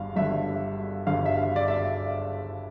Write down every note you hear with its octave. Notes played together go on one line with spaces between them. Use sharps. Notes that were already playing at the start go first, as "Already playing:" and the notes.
Already playing: G1 G2 F5
G1 G2 D3 E5
G1 G2 D3 F5
E5
F5
D5
E5